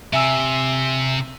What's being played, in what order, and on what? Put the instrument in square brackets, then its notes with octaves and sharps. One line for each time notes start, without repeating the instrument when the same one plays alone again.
[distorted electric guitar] C3 [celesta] E5 G#5 E6